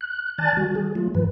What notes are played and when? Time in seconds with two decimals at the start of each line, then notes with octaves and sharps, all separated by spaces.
0.01 F#6
0.38 D#3 D5 G#5 A5 F#6 A6
0.57 D#3 G3 F#4
0.75 G#4
0.95 F#3 A3 F4
1.15 G2 D#3 F3 B4